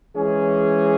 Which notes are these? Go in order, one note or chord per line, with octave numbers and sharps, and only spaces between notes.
E3 G#3 C#4 G#4